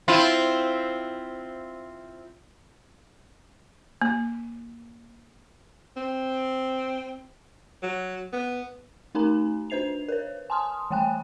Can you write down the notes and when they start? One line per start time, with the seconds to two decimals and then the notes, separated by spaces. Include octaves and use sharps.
0.08 C4 E4 F4
4.02 A#3
5.97 C4
7.82 F#3
8.33 B3
9.15 A3 D#4 A#4 G#5 A#5
9.70 D4 B4 C5 C7 F7
10.08 A#4 B4 C#5
10.50 G#5 A5 C6 D#6 F6
10.91 E3 A3 C#5 G5 G#5 F#6